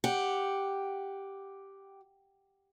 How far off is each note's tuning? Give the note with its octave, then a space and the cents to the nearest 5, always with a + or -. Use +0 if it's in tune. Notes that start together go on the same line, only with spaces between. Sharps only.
G4 +0 F#5 +0